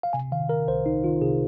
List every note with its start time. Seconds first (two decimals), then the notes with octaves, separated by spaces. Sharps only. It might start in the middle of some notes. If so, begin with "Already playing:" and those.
0.03 F5
0.13 C3 G#5
0.32 D#3 F5
0.49 D#3 A#4
0.68 C2 C5
0.85 C2 D#4
1.04 D#3 F4
1.22 C3 G#4